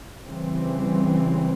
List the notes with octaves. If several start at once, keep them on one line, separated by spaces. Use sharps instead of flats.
C#3 E3 G3 C4